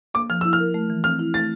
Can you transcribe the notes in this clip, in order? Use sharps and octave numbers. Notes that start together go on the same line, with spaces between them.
A#3 D6
F3 F6
E4 E6
F6
A#4
A3
E3
C4 F6
E4
A3 A6